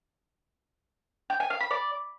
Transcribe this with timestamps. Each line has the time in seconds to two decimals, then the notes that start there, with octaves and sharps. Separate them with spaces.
1.30 G5
1.40 G#5
1.50 F5
1.60 B5
1.71 D5